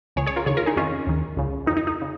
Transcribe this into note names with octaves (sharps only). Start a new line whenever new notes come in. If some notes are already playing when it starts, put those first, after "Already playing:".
C#2 C#3 G#4 C#5
G#4 C#5
F4 A#4
D#2 C#3 G#4 C#5
F4 A#4
D#4 G#4
F2 D#3 C#4 F4
D#2 D#3
C#2 C#3
F2 D#3 D#4
D#4
D#4
C#3